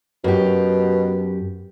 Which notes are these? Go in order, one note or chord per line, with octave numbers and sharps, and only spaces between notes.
F#2 B2 G4